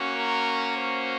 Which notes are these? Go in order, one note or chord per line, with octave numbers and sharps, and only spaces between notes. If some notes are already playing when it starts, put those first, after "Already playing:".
Already playing: A#3 C#4 F#4
A#4
C5